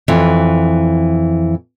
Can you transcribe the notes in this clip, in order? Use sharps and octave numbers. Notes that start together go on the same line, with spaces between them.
F2 E3